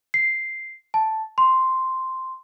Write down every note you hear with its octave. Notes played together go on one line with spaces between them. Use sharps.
C7
A5
C6